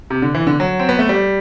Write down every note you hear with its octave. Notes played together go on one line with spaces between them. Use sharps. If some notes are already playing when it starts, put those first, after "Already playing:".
C3
D3
E3
D3
F#3
C4
B3
A3
G3